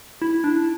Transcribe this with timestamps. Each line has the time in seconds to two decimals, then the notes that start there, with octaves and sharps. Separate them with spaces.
0.22 E4
0.44 D4